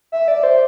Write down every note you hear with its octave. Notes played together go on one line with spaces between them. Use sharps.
E5
D5
C5